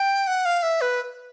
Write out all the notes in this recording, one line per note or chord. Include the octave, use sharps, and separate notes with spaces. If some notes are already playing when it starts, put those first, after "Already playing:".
Already playing: G5
F#5
F5
E5
B4